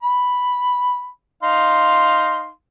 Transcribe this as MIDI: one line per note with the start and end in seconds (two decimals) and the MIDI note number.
0.03 1.09 83
1.43 2.49 63
1.43 2.49 77
1.43 2.49 84